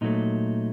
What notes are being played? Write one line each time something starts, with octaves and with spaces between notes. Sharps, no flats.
A#2 F#3 A3 D#4